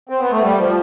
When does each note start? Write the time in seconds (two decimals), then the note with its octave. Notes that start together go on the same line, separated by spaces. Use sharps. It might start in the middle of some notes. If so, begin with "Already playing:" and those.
0.09 C4
0.20 B3
0.31 A3
0.42 G3
0.58 F3